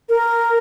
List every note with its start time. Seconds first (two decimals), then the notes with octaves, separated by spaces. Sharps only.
0.09 A#4